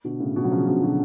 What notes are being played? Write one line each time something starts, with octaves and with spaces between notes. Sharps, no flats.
B2 D3
A2 C#3
B2 D3
F#3
C#3 F3
B2 D3
B2 D3